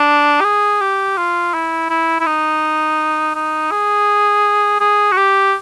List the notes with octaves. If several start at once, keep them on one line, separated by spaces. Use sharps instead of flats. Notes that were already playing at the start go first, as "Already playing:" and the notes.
Already playing: D4
G4
G#4
G4
F4
E4
E4
E4
D#4
D#4
G#4
G#4
F#4
G4